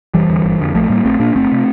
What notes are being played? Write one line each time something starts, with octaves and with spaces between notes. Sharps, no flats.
F1 E3 G3
E2 D3
G1
F2 D3
A#1 F3 A3
A2 G3 A#3
A#1 A3 C4
A#2 A#3 D4
G1 A3 C4
C3